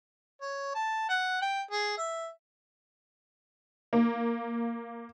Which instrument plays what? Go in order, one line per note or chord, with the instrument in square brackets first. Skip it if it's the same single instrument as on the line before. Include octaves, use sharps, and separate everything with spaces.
[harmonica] C#5
A5
F#5
G5
G#4
E5
[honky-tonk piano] A#3